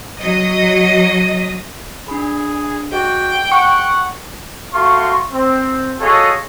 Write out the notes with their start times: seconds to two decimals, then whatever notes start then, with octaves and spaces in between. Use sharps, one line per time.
0.19 F#3 D#5
2.08 D4 G#4 B5
2.92 F#4 G#4 D#5 G5
3.52 F#5 C#6
4.74 A3 F4 F#4 C6 C#6
5.32 C4
6.00 F4 F#4 G#4 A4 C#5 D#5